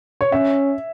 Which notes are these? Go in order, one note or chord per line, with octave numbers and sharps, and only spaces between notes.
C#5
C#4 E5